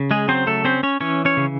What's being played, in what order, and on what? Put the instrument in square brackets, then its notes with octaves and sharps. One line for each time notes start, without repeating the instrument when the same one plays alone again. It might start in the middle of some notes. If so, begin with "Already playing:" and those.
Already playing: [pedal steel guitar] C#3
G#3 G#4
F#3 C4 C5
A3 A4
C4 C#4 C5
C#4 C#5
E3 C#4 C#5
C#4 C#5
C#3